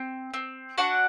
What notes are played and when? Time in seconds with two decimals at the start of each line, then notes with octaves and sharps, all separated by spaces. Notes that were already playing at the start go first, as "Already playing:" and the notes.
Already playing: C4
0.34 C4
0.78 D4 F#4 F#5